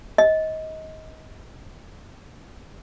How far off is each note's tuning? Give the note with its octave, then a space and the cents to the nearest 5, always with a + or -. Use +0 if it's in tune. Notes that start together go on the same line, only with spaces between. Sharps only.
D#5 +25